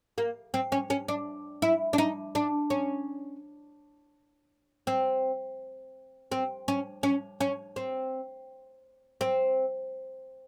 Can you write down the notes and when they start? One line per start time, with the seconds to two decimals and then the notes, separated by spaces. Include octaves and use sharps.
0.18 A#3
0.54 C4
0.72 C#4
0.90 C#4
1.08 D4
1.62 E4
1.93 D4
1.98 D#4
2.35 D4
2.70 C#4
4.87 C4
6.32 C4
6.68 C#4
7.03 C#4
7.40 C#4
7.76 C4
9.21 C4